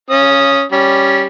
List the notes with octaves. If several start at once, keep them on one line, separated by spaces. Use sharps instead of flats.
C#4 D#6
G3 C#4